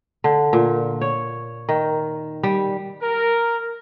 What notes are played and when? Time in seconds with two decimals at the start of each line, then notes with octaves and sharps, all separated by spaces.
0.24 D3
0.53 A#2
1.01 C#5
1.69 D#3
2.43 G3
3.01 A#4